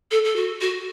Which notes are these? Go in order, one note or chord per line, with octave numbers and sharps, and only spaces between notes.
A4
A4
F#4
F#4